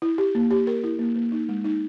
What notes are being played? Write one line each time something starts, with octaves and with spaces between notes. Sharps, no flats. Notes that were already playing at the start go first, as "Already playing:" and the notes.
E4
G4
A#3
G4
A#4
E4
A#3
A#3
D#4
G#3
D#4